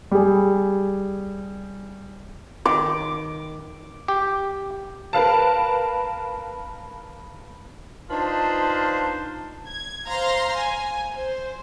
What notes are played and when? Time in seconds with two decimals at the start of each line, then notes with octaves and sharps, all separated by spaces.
0.11 G3 G#4
2.65 D#3 D6
4.08 G4
5.13 A#4 B4 F5 A5
8.10 D4 D#4 F4 B4 C5 A5
9.67 G#6
10.09 C5 F5 A#5 C6
10.58 G#5
11.17 C5